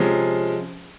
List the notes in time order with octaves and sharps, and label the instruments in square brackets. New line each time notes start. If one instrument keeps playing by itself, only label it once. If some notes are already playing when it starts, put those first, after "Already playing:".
Already playing: [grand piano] C3 F3 G#3 C#4